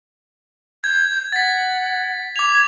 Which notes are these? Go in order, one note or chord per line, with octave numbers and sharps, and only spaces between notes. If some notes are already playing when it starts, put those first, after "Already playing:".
G6 G#6
F#5 A6 B6
D6 G#6 F7